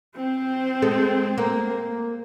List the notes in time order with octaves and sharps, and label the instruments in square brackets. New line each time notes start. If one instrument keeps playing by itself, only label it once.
[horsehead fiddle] C4 C5
[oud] G#3 A4
A#3